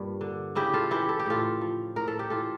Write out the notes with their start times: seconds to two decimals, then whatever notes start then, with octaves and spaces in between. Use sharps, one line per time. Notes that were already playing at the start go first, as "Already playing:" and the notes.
Already playing: G2 A#2 G3
0.21 D3
0.55 C#3 E4 G4
0.74 F4 A4
0.91 E3 E4 G4
1.09 A4
1.20 G4
1.26 A2 F4 A4
1.61 F3
1.96 A2 A#4
2.08 A4
2.19 G4
2.30 E3 F4 A4